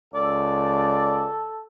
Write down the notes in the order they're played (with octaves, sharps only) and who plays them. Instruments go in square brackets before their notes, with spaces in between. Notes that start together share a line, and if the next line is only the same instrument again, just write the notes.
[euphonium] C#2 [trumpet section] A4 [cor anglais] D5